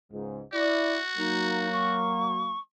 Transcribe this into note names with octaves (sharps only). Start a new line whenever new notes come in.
C#2 G#2
E4 F#4 D5
F#3 A#3 D#4
C#6